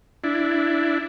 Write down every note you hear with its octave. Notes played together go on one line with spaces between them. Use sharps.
D4 E4